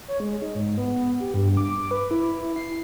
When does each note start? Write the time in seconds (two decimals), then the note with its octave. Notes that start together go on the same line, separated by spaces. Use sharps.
0.08 C#5
0.20 G#3
0.42 D#4
0.55 G#2
0.77 B3
1.20 G4
1.34 G2
1.57 D6
1.91 B4
2.11 E4
2.56 C7